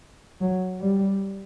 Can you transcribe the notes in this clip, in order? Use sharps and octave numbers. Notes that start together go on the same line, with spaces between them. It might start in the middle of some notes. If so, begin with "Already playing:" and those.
F#3
G3